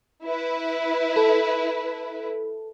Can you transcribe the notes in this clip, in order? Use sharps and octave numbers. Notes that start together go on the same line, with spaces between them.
E4 B4
A4